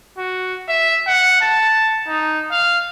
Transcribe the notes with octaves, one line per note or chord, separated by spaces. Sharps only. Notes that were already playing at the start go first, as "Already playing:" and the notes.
F#4
E5
F#5
A5
D#4
F5